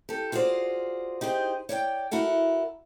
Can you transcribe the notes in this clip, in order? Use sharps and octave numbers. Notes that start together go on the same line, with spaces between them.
G4 A4
F4 F#4 G#4 A#4 C5 D5
D#4 G4 G#4 C5
C#5 D5 F5 G5
E4 F#4 A4 A#4 F#5